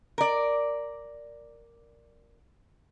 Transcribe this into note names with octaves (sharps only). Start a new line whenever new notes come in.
A#4 D5